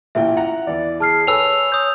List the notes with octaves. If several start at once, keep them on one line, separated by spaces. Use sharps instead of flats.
A1 A#2 E5 G5
F#5 A#5
E2 E3 D5
G#4 A5 F6 C7
A4 B4 C#5 G#5 E6 F7
C#5 D#6 G6